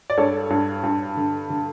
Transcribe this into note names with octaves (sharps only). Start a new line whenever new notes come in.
D5
G2 A4 C#5
G2
G2
D3
D3